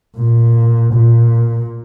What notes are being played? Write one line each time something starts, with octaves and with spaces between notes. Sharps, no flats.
A#2
A#2